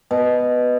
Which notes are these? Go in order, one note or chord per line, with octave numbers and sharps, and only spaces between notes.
B2